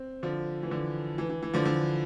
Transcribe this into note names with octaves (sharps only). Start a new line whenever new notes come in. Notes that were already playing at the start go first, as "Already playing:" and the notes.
Already playing: C4
D3 F3
E3
D3
E3
E3
E3
D3 F3
D3